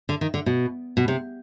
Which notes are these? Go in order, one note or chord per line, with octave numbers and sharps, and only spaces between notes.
D3
D#3
D3
B2
B2
C3